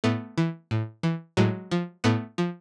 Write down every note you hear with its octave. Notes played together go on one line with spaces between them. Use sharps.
A2 A3 B3
E3
A2
E3
A2 F#3 G#3
F3
A2 A3 B3
F3